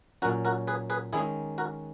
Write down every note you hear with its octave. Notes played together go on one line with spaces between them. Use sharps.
A#2 F#3 C#4 F#4 A#4
F#4 A#4
G#4 B4
G#4 B4
D#3 G#3 C#4 E4 G#4
F#4 A#4